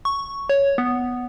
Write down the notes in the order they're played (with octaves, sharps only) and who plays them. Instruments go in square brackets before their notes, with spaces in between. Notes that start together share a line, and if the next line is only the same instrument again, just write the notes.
[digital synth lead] C#6
C#5
B3